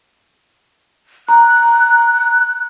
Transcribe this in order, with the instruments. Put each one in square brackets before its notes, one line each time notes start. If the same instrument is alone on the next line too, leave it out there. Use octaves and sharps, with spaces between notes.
[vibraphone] A#5 [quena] F#6